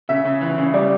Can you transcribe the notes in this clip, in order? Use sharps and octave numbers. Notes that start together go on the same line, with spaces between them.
C#3 E5
C#3
E3
C#3
G3 D5